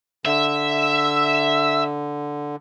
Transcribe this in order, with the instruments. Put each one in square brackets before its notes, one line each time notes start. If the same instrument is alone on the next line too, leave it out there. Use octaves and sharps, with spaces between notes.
[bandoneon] D3 [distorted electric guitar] E5